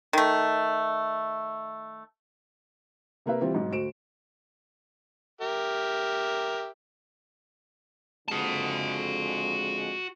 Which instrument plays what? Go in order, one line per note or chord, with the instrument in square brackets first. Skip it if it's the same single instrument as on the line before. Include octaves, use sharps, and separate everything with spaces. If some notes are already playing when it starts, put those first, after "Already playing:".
[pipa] D#3 A3
[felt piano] C3 A#3 B4 E5
E3 G3 C4 F4
B1 G#2
D2 F#4 C5 D7 E7
[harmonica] G4 A#4 E5
[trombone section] F2 D3 G#3 [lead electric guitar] F#4 A5